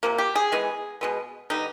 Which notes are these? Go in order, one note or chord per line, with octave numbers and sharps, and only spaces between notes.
C3 F3 A#3
G4
G#4
E3 G#3 B3
B2 G#3 B3
D3 G3 B3 D#4